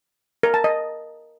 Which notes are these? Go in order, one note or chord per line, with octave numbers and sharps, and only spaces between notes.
A#4
A5
D#5